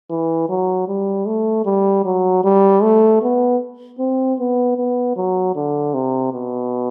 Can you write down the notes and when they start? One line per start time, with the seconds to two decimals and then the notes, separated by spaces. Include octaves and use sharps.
0.10 E3
0.49 F#3
0.88 G3
1.26 A3
1.65 G3
2.05 F#3
2.44 G3
2.82 A3
3.22 B3
3.99 C4
4.39 B3
4.77 B3
5.16 F#3
5.56 D3
5.94 C3
6.33 B2